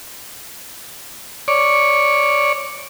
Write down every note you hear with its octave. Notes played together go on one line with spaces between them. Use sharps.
C#5 D5